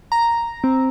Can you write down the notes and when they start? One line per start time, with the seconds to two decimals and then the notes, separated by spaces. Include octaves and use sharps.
0.12 A#5
0.64 C4